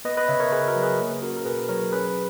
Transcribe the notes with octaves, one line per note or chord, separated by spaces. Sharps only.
B3 B4 D#5
B4 D#5
C#3 C#5 E5
A#4 C#5
C#3 G#4 B4
F#4 A#4
F#3
G#4 B4
A#3
C#4 F#4 A#4
A#4
B2 G#4 B4
F#3 A#4 C#5
C#4 G#4 B4